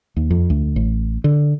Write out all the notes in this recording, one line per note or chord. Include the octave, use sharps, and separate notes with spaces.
D#2
F2
D2
A1
D3